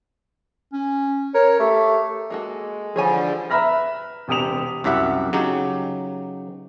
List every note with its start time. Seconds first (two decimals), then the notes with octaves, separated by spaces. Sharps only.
0.73 C#4
1.35 A#4 C#5
1.60 A3 G4
2.30 G#3 A#3 F#4 A4
2.96 D3 E3 F3 G3 G#4 C#5 G#5
3.50 B4 E5 A#5 B5 F6 A#6
4.28 E1 C3 G4 D#6 E7 F7
4.84 C2 F#2 G4 E5 F#5
5.33 C#3 F#3 D#4 G4